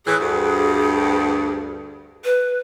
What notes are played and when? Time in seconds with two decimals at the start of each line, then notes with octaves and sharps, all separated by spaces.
0.06 A2 E3 G#4
0.20 D2 G2
2.25 B4